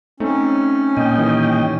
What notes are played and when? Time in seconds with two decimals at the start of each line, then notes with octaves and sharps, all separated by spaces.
0.20 A3 C4 C#4 D#4
0.97 A#2 D#5 G5
1.17 D#3 E3 G3